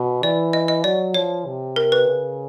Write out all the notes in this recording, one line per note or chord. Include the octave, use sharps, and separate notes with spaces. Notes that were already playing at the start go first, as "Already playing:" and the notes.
Already playing: B2
E3 D5
D#5
D#5
F#3 D5
F3 C#5
C3
A#4
B4
C#3